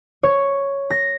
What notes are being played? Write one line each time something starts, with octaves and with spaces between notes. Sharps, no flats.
C#5
A#6